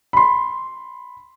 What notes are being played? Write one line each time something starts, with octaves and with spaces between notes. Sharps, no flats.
B5 C6